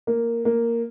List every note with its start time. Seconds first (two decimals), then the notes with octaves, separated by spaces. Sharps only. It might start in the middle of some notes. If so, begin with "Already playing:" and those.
0.07 A#3
0.45 A#3